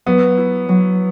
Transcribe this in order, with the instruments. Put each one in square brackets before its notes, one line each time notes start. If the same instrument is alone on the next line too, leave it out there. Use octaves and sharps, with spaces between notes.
[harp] F#3 [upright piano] B3
[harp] E4
F#3